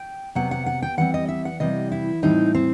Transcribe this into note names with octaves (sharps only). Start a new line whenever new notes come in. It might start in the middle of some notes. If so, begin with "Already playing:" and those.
Already playing: G5
C3 F#3 B3 F#5
F#5
F#5
G5
E3 G3 C4 F#5
D#5
E5
F#5
C3 E3 G3 C4 D#5
E4
A2 E3 G3 C4 D#4
C4